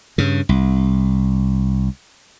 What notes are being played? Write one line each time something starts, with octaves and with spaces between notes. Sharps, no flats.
G2 C#3
C2